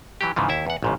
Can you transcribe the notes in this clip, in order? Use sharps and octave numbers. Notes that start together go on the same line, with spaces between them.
E3 F#3 G4
G#2 C#3 E3 F3
D#2 E4 E5
E2 F#5
A1 G#2 C#3